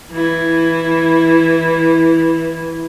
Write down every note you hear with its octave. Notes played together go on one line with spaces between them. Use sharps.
E3 E4